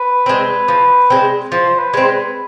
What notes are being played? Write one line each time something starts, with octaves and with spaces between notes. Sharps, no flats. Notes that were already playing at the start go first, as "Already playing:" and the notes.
Already playing: B4
G#3 C4
F3
G#3 C4
F3 C5
B4
G#3 C4
C5
B4